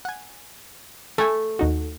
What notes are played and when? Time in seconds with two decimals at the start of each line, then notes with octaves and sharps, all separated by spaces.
0.05 F#5 G#5
1.18 A3 A4 G#5
1.59 D#2 D#4 F#4